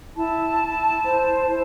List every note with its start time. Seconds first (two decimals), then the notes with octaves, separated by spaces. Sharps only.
0.16 E4 A5
0.59 E4
1.03 C5
1.48 E4